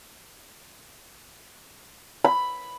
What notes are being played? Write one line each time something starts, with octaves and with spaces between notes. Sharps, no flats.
B5